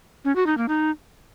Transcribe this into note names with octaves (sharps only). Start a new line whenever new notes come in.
C#4
F#4
D#4
A#3
D#4